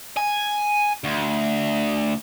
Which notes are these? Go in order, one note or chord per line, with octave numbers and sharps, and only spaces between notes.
G#5
D2